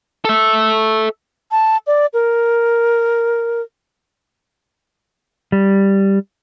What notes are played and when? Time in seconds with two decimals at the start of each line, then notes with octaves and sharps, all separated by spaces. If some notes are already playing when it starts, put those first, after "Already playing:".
0.25 A4 E5
1.51 A5
1.87 D5
2.14 A#4
5.52 G3